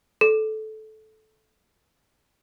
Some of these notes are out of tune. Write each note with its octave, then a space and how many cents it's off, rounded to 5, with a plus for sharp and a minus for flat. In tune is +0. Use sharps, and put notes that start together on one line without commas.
A4 -15